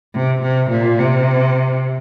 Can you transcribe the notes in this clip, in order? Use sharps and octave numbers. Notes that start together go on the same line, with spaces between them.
C3
C3
A#2
C3